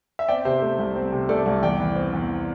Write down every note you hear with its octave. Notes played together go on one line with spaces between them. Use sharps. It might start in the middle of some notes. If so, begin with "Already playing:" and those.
E5
C4 D5 G5
C3 C5 E5
A3
C2
C4
C3
A3 A4 D5
C2
E2 D5 G5
E3
C4
E2